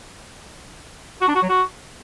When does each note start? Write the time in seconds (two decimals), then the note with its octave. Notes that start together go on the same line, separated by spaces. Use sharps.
1.21 F#4
1.28 D4
1.35 F#4
1.42 F#3
1.49 F#4